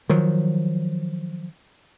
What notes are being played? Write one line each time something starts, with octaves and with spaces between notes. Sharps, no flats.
D#3 F3 F#3